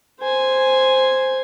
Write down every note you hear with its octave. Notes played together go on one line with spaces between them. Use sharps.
C5 G#5